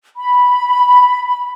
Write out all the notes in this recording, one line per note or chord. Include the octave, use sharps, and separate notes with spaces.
B5